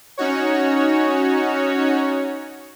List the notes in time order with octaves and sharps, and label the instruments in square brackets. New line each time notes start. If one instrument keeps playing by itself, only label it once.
[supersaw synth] C#4 D#4 F#4 C#5